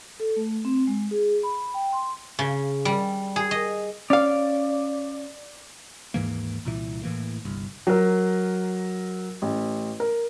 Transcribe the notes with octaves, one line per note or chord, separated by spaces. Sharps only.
A4
A3
C4
G#3
G#4
B5
G5
C6
C#3
G3
G#4
D#5
C#4 D5 F5
D#2 G#2 E3 A#3
C2 A#2 E3
A2 E3 A#3
G1 C2
F#3 A#4
A1
A#4